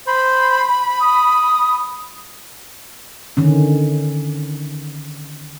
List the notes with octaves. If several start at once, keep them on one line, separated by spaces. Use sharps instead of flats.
C5 B5
D#6
D3 D#3 C#4